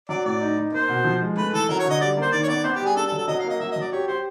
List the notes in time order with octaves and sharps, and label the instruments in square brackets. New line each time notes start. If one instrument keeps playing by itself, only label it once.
[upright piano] F#3 [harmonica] D5
[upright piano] A2 [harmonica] D5
[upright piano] D#4
D#4
[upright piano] A#3 [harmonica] C5
[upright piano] B2
F3
G#3
[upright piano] A3 [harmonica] B4
[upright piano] E3 [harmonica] A4
[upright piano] F#3 [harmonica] A#4
[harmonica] C#5
[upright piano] D3
[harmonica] D#5
[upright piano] G3 [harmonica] D5
[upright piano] A#3 [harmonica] C5
[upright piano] D#3 [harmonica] D5
[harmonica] C#5
[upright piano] B3 [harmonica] D5
[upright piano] B3 [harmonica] C5
[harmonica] G4
[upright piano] G3
[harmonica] G#4
[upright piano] D4 [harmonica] A4
[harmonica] A4
[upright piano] F#3
[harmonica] A4
[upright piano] F#3 [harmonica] D#5
[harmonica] F5
[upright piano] A#3
[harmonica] D#5
[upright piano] F#3 [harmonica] E5
[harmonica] D#5
[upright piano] F#3
[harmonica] D5
[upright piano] G4 [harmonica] C#5
[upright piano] G4 [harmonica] C5